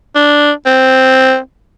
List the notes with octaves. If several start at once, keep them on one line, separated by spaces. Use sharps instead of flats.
D4
C4